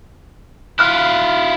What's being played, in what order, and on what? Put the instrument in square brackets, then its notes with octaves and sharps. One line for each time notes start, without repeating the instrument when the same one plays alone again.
[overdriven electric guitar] E4 F4 [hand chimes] F6 F#6